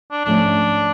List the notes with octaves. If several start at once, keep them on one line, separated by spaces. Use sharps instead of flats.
D4
G#2 F3 A3 C#4 D4